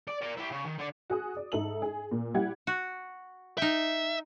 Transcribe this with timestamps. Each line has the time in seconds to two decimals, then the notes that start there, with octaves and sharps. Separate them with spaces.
0.08 D5
0.21 A#4 D5
0.37 E4 G4
0.51 C#3
0.65 D#3
0.78 D3 D5
1.10 F#4 G#4 D#6
1.36 D5
1.52 G#2 D#4 A4 E5 F#7
1.82 G#4
2.11 A#2
2.34 G3 E4 G4 F#5 G#6
2.67 F#4
3.58 D#4 E5 G5